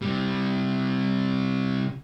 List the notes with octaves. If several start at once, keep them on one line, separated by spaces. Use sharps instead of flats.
C3 G3